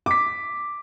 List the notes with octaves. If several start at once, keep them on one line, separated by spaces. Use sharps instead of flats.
D6 B6